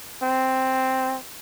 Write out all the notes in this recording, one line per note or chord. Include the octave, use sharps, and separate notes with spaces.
C4